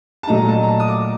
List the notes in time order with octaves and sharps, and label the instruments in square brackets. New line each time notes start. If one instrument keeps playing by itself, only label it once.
[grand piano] A5
A#2 F#3 A3 D#4 A#5
A5
A#5
A5
D#6
D6